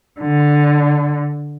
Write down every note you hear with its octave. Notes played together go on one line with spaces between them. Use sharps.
D3